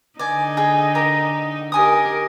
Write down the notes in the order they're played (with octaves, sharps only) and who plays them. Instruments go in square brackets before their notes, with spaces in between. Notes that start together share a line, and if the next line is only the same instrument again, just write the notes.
[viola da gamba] D3 D#4 [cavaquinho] D5 G#5
[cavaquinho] G#4 G5
G4 A#4
[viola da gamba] D#4 G4 A#4 [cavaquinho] G5 G#5 D#6